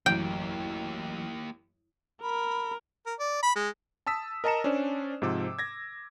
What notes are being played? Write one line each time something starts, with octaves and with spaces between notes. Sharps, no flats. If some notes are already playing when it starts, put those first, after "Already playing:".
A1 F#2 A#3 G4 G5
A#4 B5
A#4
D5
B5
G#3
A5 D#6 E6 B6
A#4 D#5 A5 A#5 C#7 E7
C#4 D4 C5 D5
G#2 C3 F3 D6 E6
G#6 A#6